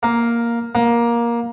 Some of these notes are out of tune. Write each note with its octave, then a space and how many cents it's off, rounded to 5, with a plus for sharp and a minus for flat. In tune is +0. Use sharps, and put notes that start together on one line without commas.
A#3 +5
A#3 +15